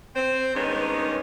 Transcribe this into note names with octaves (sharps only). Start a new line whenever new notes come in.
C4 C5
G2 D#3 G#3 B3 C#4 D#4